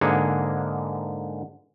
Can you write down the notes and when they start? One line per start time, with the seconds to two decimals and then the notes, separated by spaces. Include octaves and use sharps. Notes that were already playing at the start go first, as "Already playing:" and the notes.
0.01 G#2 D3 A#3 G#4 F#5